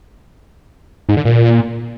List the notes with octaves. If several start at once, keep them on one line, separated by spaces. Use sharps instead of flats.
G#2
D3
A#2